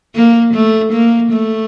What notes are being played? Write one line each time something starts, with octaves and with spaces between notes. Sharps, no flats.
A#3
A3
A#3
A3